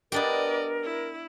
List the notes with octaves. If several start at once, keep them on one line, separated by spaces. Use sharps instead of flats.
B3 D4 G4 A#4 D5 D#5
E4